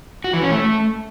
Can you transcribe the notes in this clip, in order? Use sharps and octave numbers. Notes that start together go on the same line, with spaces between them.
F#4
E3
C#4
A3